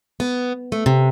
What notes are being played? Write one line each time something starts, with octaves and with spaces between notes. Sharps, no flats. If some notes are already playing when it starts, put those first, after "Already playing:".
B3
A3
C3